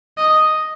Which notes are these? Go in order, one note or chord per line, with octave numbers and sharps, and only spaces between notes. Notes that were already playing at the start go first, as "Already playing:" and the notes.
D#5